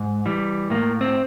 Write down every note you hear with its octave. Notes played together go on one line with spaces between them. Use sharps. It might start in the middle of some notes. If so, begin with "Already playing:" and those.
Already playing: G#2
E3 G3
A2 A#3
C4